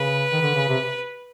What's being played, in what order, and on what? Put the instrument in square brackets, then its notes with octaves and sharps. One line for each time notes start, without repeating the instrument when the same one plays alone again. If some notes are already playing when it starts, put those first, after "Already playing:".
Already playing: [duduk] C#3 [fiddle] B4
[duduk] D#3
D3
C#3
C3